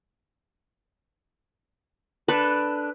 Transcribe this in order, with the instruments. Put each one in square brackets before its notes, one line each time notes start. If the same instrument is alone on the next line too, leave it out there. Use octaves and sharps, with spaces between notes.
[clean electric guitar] D4 A4 [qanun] B4